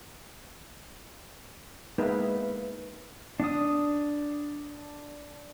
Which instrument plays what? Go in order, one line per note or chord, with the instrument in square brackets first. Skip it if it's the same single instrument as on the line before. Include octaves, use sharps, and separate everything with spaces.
[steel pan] G#3 A#3 B3 D#4 E4 B4
[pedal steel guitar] D4 D#6